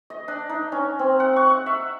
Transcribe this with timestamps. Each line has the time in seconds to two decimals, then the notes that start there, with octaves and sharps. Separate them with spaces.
0.10 D#5
0.28 D4
0.49 D#4
0.72 C#4
0.99 C4
1.20 F#5
1.36 C#6
1.50 F#5
1.66 E5